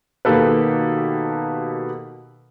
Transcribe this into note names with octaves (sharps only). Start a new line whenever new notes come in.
B2 D#3 A#3 G4 A4 B4